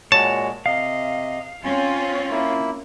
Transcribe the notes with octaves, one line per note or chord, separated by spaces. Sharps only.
A#2 G#3 F#4 C#5 A5
C3 D#5 F5
C4 C#4 F4 G#5
A#3 E4